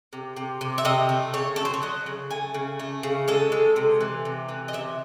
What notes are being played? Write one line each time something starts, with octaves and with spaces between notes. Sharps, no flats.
C3
C3
C3
E5
C3 D#5
A3
C#3 C#5
F#3 A4
C5
C#5
F#3 D#5
C#3
A3 G#5
C#3
A3
C#3
G#3 A4
G#3
C3
E3
C3
E3
D#5
C3 E5